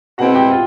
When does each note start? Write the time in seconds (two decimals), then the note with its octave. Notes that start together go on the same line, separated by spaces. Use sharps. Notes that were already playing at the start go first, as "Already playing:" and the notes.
0.18 B2 G#3 C4 E4 F#4 F#5
0.35 G4 G5
0.52 F4